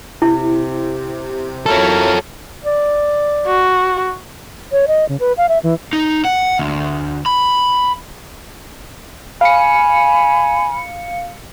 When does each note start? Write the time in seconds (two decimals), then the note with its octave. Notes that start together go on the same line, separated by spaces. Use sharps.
0.22 C3 E4
1.66 F#3 E4 F4 A4 A#4 C#5
2.64 D5
3.46 F#4
4.72 C#5
4.88 D#5
5.09 C#3
5.20 B4
5.37 F5
5.49 E5
5.63 E3
5.93 D#4
6.25 F#5
6.59 D2
7.26 B5
9.41 F5 G#5 B5 C#7